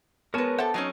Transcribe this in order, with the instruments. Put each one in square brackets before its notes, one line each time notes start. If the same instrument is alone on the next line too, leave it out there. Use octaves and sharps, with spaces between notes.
[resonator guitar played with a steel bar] G#3 B4 [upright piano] B3 [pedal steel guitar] A#4 C#5 A5
[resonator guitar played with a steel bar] G4 A4 [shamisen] C5 E5 F#5
[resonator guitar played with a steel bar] F#3 C4 C#4 [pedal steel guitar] D#4